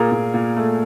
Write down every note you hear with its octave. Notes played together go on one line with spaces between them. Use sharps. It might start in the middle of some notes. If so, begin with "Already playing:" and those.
Already playing: A#2 G#4 A#4
A#2
A#2
A3